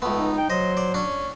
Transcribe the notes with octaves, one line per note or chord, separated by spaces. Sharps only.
C#2 A3 B3
D#4
G5
F#3 C5 D#5
D5
C#4 D4